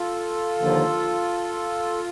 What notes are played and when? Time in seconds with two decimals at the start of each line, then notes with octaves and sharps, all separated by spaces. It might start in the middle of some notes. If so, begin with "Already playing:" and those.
Already playing: F4 A4
0.59 D#2 D3 F3 A#3